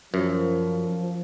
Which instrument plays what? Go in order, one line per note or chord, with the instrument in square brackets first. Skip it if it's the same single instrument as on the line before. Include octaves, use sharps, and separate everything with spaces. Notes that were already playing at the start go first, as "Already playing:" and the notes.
[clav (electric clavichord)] F#2 [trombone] F3